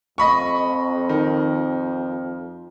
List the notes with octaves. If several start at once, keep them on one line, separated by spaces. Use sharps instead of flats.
F2 D#5 B5 C#6
D#3